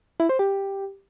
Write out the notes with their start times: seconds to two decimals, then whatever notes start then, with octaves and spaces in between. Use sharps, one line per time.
0.20 E4
0.29 C5
0.39 G4